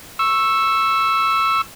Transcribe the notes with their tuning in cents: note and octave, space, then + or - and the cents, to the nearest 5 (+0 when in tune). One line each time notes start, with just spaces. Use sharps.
C#6 -15 E6 +0